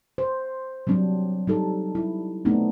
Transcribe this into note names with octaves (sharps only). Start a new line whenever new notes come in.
C5
F#3 G3 C4 D4
G3 D#4 A4
E4
A3 B3 C4 D4 D#4